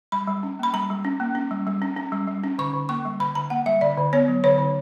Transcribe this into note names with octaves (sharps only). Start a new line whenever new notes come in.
G3 B5
G3
C#4
A#3 B5
G3 A#5
G3
C#4
A#3
C#4
G3
G3
C#4
C#4
G3
G3
C#4
D3 C#6
D3
A#3 C#6
G3
D3 B5
D3 A#5
A#3 F#5
G3 E5
D3 D5
D3
B3 C#5
F#3
D3 C#5
D3